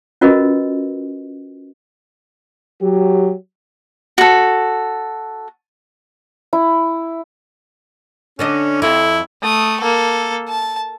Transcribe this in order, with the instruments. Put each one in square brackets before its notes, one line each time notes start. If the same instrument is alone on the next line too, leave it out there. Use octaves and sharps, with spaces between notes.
[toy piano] C#4 F4 F#4 A#4 B4 D#5
[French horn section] F#3 G4
[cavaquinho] F#4 A4
[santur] E4
[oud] D3 D4 D#5 [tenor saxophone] C#4
[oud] F2 [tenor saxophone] E4
[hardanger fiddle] A3 D#6
A#3 A4
A5